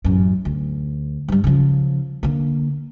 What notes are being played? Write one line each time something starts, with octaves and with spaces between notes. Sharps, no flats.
A1 F#2
D2
G2 G3
C#3 F3
D3 A#3